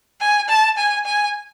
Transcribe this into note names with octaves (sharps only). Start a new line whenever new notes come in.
G#5
A5
G#5
G#5